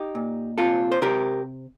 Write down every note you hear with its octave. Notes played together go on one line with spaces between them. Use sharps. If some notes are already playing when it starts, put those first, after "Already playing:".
Already playing: D#4 G4
A#2
C3 F4 A4
C5
C3 G4 A#4